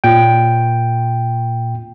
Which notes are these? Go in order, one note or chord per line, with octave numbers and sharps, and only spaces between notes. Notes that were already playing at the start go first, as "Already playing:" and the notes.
A#2 G5